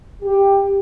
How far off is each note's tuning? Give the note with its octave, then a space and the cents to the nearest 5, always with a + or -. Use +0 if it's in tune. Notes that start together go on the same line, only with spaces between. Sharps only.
G4 +10